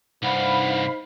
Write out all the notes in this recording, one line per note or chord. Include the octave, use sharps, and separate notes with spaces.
C2 G2 D#4 C5 F5 F#5 B5